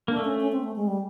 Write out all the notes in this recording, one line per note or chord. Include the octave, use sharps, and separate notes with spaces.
A#3 D4
A3
C#4
C#4
C4
A3
G#3
G3